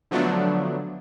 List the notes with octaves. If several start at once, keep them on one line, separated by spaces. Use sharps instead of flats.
D3 F3 F#3 A3 B3 D4